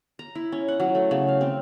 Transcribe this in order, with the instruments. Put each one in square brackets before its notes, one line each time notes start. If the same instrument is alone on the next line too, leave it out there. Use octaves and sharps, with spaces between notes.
[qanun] A#5
E4
C#4
F#5
F#3
A3
C#3
F5
C4